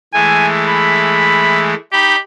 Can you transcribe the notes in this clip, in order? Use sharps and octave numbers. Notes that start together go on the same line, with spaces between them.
E3 G#3 A3 G#5
B5
D#4 G4 B5